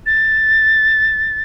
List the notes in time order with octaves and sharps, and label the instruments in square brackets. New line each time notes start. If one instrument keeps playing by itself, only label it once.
[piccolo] A6